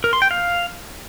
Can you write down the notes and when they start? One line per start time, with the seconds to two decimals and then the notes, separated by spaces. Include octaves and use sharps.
0.04 A#4
0.13 C6
0.22 G5
0.31 F5